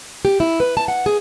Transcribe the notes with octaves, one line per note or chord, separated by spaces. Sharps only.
G4
E4
B4
A5
F#5
G#4